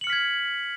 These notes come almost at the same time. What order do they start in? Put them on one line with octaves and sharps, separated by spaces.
F#7 C#7 F6 B6 G#6